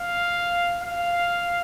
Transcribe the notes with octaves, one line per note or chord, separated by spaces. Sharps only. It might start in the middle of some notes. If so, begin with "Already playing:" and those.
Already playing: F5
F5